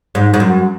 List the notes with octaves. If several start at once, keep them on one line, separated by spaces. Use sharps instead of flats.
G#2
G#2
F#2